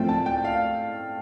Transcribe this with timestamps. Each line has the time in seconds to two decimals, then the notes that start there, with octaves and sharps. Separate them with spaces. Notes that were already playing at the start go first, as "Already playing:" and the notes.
Already playing: A2 F3 A3 C4 G5
0.09 A5
0.26 G5
0.45 F5